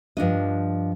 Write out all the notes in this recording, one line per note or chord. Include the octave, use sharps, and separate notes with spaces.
G2 F3 D4 D#5